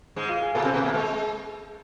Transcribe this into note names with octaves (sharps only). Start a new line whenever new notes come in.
G#2 G#3
F4
G#4
A#2 A#3 A4
C3 C4
B2 B3
A#2 A#3
G#3 A4